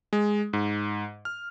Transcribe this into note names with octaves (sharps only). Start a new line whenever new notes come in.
G#3
G#2
F6